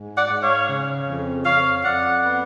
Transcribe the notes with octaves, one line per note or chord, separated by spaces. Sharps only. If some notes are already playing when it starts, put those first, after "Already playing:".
Already playing: G#2
D5 F#5
G#2
C#5 F5
C#3
F2
F2 C#5 F5
F2 D5 F#5
B3